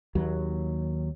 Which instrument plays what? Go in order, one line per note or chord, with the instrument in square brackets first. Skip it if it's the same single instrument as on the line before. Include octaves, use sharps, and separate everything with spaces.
[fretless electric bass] D#2 F#3